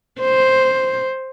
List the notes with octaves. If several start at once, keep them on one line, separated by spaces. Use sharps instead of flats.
C5